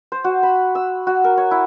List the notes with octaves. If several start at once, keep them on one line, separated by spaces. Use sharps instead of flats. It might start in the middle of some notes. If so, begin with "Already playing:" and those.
C5
F#4
B5
E6
F#4
A#4
C#5
E4